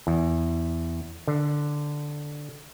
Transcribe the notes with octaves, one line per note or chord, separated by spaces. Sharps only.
E2
D3